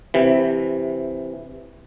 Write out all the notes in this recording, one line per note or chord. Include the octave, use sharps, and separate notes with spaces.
C3 E3